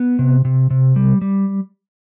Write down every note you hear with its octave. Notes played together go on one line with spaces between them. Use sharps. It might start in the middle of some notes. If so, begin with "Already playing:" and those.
Already playing: B3
C3
C3
C3
G3
G3